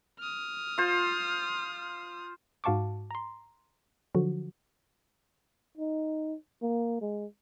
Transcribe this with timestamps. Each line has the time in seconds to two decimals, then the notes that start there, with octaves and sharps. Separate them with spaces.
0.19 D#6 F6
0.78 F4 C5
2.64 G#2 F#4 F5 A5 C#6 D6
3.11 A#5 C6
4.15 D3 F3 F#3 F#4
5.77 D#4
6.62 A#3
7.01 G#3